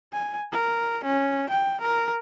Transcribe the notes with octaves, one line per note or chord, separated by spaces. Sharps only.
G#5
A#4
C#4
G5
A#4